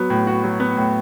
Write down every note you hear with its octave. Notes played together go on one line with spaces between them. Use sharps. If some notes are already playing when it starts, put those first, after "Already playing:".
Already playing: F#3 B3
A2
F#4
F#3
B3
A2